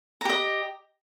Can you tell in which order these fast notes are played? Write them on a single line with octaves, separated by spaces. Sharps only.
A#5 G4 D#5